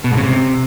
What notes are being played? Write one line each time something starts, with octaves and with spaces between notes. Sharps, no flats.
B2
G#2
C#3
C3